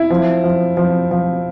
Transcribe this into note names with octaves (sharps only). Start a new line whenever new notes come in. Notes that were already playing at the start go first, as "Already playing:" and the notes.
Already playing: E4
F3
F3
F3
F3